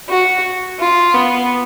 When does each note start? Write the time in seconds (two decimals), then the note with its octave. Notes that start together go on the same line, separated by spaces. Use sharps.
0.09 F#4
0.80 F4
1.14 B3